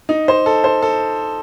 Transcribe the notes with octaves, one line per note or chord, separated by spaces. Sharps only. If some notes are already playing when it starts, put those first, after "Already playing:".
D#4
C5
A4
C5
A4